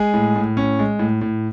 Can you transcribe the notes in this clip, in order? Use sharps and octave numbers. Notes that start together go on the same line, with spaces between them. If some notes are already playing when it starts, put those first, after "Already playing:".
Already playing: G#3 G#4
A2
A2
C#4
G#3
A2
A2